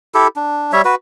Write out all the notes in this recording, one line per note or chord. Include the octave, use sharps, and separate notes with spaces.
E4 G4 A4
D4
G3 C#5 E5
F#4 B4